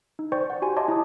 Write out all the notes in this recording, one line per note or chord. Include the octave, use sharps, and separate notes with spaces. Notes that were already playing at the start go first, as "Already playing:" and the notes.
D#4
C5 D5 G5 C#6 G6
F#5
F#4 G4 G#5 C6
C#5 D#5 E5 A5 C6 D6
E4 A#5 D#6